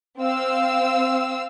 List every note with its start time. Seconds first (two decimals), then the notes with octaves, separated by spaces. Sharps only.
0.19 C4 F5 E6